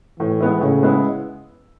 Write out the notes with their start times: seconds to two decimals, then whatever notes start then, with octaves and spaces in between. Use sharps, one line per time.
0.19 A2 E3
0.40 G#3 B3 E4
0.61 A2 C#3
0.83 G#3 B3 E4